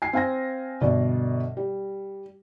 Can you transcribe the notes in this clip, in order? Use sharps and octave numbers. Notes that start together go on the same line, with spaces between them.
G#5 C7
C4 F5 G#5 A#6
G1 B2 D5
G3